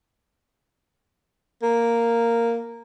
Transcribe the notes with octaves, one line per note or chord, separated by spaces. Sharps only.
A#3